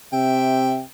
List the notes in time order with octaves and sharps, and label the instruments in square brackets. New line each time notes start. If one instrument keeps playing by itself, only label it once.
[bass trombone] C3 [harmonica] E5 G5